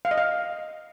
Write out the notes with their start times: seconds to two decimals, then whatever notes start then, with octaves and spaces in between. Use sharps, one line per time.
0.05 F5
0.11 D#5
0.18 F5